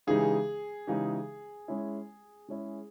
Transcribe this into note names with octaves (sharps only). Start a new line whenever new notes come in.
C#3 E3 G#3 D#4 G4 G#4
C#3 E3 G#3 D#4 G4
G#3 C#4 E4
G#3 C#4 E4